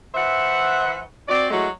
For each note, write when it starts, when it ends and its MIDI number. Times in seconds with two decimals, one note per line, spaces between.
0.15 1.01 52
0.15 1.01 72
0.15 1.01 76
0.15 1.01 78
1.28 1.47 60
1.28 1.47 66
1.28 1.47 74
1.51 1.68 54
1.51 1.68 56
1.51 1.68 57
1.51 1.68 64
1.51 1.68 66